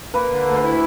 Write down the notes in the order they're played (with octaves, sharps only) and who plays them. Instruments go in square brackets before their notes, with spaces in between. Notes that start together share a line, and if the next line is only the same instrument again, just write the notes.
[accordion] A#3 [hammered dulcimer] B4
[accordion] D3
D2
E4